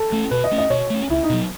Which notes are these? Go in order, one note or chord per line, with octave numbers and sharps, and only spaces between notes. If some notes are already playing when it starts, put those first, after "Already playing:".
Already playing: A4
A3 C#4
B2 B4
D#5
A3 C#4
D#5
B2 C#5
A3 C#4
C#2 E4
D#4
B2 F#3